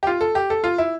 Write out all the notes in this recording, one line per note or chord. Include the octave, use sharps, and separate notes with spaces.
G4
F4
A4
G4
A4
F4
E4